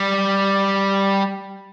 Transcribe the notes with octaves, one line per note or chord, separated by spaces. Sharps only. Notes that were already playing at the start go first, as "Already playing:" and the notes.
Already playing: G3